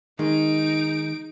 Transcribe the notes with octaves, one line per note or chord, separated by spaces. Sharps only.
D#3 G#3 D#4 D7